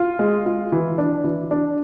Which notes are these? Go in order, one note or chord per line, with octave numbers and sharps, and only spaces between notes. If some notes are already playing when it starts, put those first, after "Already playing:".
Already playing: F4
G#3
F4
E3
D4
E3
D4